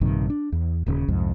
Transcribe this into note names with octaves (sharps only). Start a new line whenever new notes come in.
A#1 G2 C3 D#3
D4
E2
D#1 D#2 C#3
C2 F2 G#2